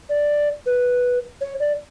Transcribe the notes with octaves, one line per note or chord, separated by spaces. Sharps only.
D5
B4
C#5
D5